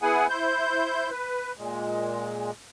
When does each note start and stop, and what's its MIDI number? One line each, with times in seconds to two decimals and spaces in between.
0.02 0.27 59
0.02 0.27 64
0.02 0.27 68
0.02 0.27 78
0.02 0.27 80
0.29 1.10 64
0.29 1.10 72
0.29 1.10 91
1.11 1.52 71
1.58 2.51 46
1.58 2.51 56